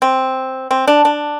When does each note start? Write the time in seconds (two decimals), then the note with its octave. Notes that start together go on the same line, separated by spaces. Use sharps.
0.02 C4
0.71 C4
0.87 D4
1.05 D4